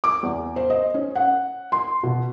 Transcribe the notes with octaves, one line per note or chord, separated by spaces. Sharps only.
D6
E2
C5
D#5
C#4
F#5
C6
B2